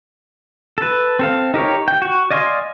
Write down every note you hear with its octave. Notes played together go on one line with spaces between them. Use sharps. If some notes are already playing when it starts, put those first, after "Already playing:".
A4 B4
C4 A4 F5
D#4 G4 A#4 C#5
G5
F#4 C#6
D5 D#5 F5 G#5 C6